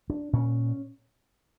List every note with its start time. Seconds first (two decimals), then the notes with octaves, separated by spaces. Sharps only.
0.10 D4
0.33 A#2 C#4